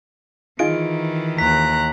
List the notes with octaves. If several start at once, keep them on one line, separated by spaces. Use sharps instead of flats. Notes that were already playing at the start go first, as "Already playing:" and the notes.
D#3 E3 D#4 F4 G#4 D7
D#2 A#5 F#6 B6